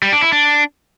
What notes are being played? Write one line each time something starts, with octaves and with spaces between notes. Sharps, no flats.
G3
D4
E4
D4